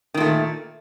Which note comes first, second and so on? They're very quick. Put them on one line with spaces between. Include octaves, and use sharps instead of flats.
D#3 A#2 A3